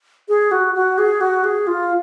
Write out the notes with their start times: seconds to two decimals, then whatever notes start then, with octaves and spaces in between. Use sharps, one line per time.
0.28 G#4
0.51 F#4
0.75 F#4
0.98 G#4
1.21 F#4
1.44 G#4
1.67 F4